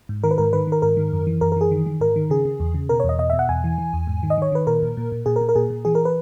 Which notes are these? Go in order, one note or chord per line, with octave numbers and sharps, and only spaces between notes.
G#2
D#3 A#4
B4
G#2 A#4
D#3 B4
D#3 A#4
G#2 A#4
D#3
F#2
E3
F#2 A#4
A#4
E3 G#4
D#3
D#3
G#2 A#4
D#3
C#3 G#4
C#3
E2
C#3
B2 A#4
C#5
E2 D#5
B2 D#5
E5
B2
F#5
E2 G#5
E3
E3
E2
G#2
D#3
D#5
D#3 C#5
D#3 B4
A#2 A#4
A#2
A#2
A#2
A#2 G#4
A#4
A#2
A#4
A#2 G#4
A#2
E3 G#4
A#4
B4